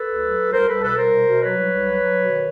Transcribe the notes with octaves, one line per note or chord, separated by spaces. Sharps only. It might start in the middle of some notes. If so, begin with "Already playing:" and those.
Already playing: A4 B4
D2
F#3
D2
C2 A#4 C5
C2 A4 B4
B2 A4 B4
C2 A#4 C5
B2
B2
F#3 B4 C#5
C2
C2
F#3
F#3
B2
D#3